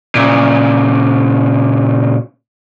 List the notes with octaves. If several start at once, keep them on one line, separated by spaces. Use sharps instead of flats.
A#2 C#3